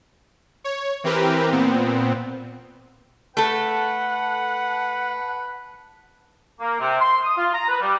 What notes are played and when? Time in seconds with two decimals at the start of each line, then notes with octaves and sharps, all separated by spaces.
0.64 C#5
1.04 E3 C4 G4 A#4 B4
1.52 A#2 B3 C4
3.37 A3 A4 B4 F#5 A5
6.60 A#3
6.78 C3
7.01 C6
7.24 D#6
7.36 F4
7.53 A#5
7.68 B4
7.80 G3